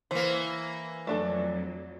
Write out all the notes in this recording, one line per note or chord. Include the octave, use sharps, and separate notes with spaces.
E3 A#3 C5
F2 F#3 A3 D4 A4